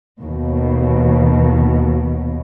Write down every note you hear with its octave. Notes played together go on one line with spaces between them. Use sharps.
D#2 B2